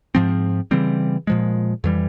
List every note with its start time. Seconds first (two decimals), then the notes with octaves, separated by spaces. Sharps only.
0.15 G#2 F3 C4
0.71 C#3 E3 G3 C4
1.27 A#2 F3 G#3
1.84 F2 E3 G3